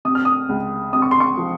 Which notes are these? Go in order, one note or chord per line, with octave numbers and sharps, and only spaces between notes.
C3 D#6
F6
D#6
C#2
C3 D#6
C#6
C6
C#6
F3